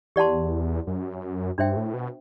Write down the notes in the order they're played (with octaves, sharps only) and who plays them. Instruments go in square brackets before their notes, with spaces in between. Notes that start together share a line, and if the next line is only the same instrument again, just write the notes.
[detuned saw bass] E2 [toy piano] G4 D5 F#5 A5 C6
[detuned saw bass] F#2
[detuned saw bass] G2 [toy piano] D4 F#4 C5 E5 G5
[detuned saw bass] A2
B2